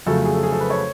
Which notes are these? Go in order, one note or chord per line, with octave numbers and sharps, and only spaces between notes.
F2 C#3 F#3 A3 A4
G#4
A4
G#4
A4
B4
C#5